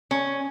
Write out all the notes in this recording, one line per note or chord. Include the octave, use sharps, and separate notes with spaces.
C#4